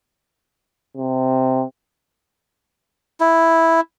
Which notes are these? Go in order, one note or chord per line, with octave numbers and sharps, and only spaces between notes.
C3
E4